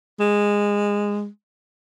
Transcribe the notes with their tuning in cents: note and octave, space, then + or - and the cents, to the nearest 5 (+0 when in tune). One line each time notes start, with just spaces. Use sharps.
G#3 -15